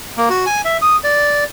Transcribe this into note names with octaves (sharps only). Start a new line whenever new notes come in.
A#3
F#4
G#5
E5
D#6
D5